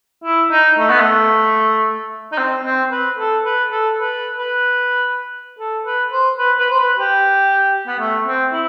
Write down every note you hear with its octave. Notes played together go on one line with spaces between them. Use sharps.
E4
D#4
A3
B3
A3
D#4
C4
C4
B4
A4
B4
A4
B4
B4
A4
B4
C5
B4
B4
C5
B4
G4
B3
A3
C4
E4